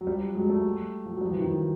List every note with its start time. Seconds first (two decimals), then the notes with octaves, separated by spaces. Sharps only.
0.01 F#3
0.07 F3 G3
0.35 F#3 G#3
0.49 G3 A3
1.06 F3
1.14 F#3
1.21 F3 G3
1.31 E3 F#3
1.40 D#3 F3